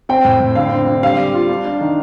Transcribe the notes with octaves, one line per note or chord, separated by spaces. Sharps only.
C4 G5
A2
A2
D3 F5
C4
D3
G3 F5
G3
F4
D4
D4
D#3